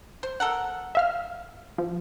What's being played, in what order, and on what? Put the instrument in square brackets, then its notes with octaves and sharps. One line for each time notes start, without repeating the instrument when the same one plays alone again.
[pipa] C5
A4 A#4 F#5
[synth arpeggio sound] E5 F5 F6
F3